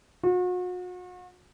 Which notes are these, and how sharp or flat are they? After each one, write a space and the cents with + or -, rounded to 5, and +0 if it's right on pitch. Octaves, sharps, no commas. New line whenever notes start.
F#4 -40